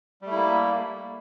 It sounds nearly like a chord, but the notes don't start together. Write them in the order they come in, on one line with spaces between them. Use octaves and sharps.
G3 A3 E4 A#3